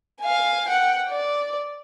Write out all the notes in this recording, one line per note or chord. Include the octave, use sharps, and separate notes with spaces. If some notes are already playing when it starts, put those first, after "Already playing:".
F5 G#5
F#5 G5
D5